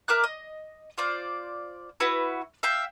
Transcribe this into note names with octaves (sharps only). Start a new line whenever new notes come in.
A#4 E5 D6 F#6
D#5
F4 C5 D5
E4 F#4 B4
E5 F5 G5